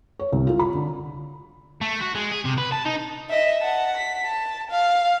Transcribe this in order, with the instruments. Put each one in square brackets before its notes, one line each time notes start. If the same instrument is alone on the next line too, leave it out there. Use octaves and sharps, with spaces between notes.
[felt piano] C#5
C2
F4
B5
D3
[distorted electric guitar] A3
F#4
G#3
G#4
C3
B4
A5
D#4
[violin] D#5 E5
F#5 A5
B6
A5
F5